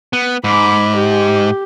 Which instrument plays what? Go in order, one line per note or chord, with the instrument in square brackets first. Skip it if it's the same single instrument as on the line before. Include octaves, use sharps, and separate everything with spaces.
[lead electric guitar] B3
[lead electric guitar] G#2 [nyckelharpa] B5 D6
[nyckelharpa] G4